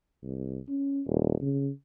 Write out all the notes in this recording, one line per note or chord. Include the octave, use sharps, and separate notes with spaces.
C2
C#4
D#1
C#3